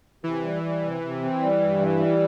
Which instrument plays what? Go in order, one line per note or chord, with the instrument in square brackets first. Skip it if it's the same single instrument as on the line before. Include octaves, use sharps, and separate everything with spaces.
[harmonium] C3 [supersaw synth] E3
[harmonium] G3
G3
C3
C3
C4
G3
G2
E3
G3